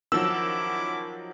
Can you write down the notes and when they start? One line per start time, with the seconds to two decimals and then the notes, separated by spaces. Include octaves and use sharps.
0.12 D#3 F3 F#3 C#4 E4 D6 E6